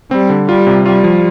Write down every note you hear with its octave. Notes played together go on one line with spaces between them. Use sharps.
G3 C4
D3
G3 F4
C3
G3 F4
F3